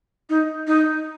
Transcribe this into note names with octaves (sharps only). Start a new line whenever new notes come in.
D#4
D#4